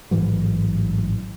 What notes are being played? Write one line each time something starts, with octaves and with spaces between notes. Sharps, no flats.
A1 G#2 E3 F#3